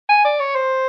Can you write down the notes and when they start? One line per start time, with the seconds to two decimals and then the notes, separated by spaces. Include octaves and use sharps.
0.09 G#5
0.25 D5
0.40 C#5
0.55 C5